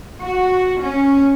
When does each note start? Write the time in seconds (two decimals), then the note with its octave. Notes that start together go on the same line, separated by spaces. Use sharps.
0.23 F#4
0.83 C#4